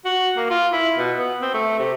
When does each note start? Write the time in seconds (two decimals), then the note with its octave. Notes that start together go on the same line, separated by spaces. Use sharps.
0.05 F#4
0.37 A#3
0.50 F4
0.73 E4
0.97 B2
1.18 B3
1.41 C4
1.54 A3
1.79 C3